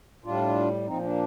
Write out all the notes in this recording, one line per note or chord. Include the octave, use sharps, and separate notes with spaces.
A2 G3 D4 F4
A#2 F3 C4 D#4
A#3 D4